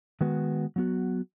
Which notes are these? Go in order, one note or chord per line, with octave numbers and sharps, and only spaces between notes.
D#3 G#3 B3 F#4 B4
F#3 B3 F#4